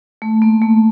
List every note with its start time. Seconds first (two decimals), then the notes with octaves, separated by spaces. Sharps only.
0.22 A3
0.42 A#3
0.62 A3